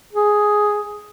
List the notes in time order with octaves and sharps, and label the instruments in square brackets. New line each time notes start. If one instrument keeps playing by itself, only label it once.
[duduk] G#4